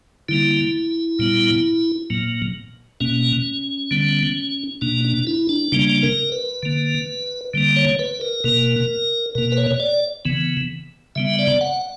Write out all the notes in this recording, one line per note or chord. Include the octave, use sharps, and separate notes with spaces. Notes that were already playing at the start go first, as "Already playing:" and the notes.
D3 G3 A#3 E4
A#2 G3 B3
A#2 F#3 A#3
B2 A#3 C#4
D3 G3 B3
B2 A#3 D4
D4
E4
D4
C#3 G3 A#3 D4
A#4
B4
D3 A#3
D3 G3 A#3
C#5
B4
A#4
B2 A#3 A#4
B2 A#3 A#4
B4
C#5
C#5
D5
C#3 E3 B3
C#3 G3 B3 E5
D5
F#5